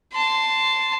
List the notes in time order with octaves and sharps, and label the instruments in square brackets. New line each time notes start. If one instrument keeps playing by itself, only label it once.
[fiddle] A5 C6